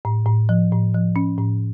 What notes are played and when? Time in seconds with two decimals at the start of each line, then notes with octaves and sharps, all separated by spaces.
0.05 A2
0.26 A2
0.49 F3
0.72 A2
0.94 F3
1.16 C#4
1.38 A2